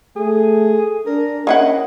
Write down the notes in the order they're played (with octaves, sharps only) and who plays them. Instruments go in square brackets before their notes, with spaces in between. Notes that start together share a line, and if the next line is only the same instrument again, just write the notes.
[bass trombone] A3 [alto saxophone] G#4
[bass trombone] D4 [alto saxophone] A#4
[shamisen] A#3 E4 F#5 [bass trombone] C#4 [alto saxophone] D#5